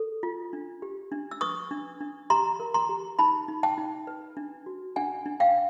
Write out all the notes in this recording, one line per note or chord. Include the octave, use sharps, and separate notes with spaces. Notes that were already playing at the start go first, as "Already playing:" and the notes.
Already playing: A4
F4
D4
G4
D4
E6
B4 C#6 D#6
D4
D4
G4 A#5 C6
A#4
A#5 C6
G4
D#4 A5 B5
D#4
G5 A5
D#4
B4
D4
F#4
D4 F#5 G#5
D4
F5 G5